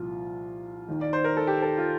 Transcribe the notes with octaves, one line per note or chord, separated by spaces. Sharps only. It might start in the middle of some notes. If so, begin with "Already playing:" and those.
Already playing: C2 A#2 F3 F4
D#2 D#3
D5
C5
A#4
A4
G4
A4
F4